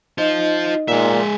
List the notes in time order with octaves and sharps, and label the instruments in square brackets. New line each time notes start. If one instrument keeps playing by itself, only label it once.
[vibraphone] D#4 D#5 [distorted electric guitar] F4 C5
[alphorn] A#2 [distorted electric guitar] G#3 E5